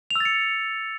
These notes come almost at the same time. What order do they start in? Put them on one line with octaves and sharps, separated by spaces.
F7 E6 A6 C#7